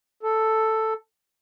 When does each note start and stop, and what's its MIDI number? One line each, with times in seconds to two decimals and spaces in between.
0.23 0.94 69